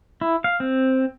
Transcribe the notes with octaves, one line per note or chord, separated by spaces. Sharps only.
E4
F5
C4